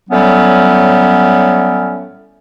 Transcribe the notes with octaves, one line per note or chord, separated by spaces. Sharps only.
A2 F#3 G3 B3 C#4